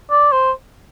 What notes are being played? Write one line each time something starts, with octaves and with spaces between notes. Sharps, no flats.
D5
C5